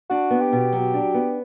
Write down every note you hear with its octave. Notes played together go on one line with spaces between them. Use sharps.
D4 F#4
B3
G4
B2
F#3
D4
B3